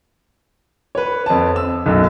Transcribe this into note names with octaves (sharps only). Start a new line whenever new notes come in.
B4 C#5
F2 A5
E6
B1 F#2